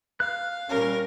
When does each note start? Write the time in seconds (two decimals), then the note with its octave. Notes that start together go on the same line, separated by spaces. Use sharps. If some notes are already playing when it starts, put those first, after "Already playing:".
0.20 F5 F#6
0.69 A#2 G3 C#4 A#4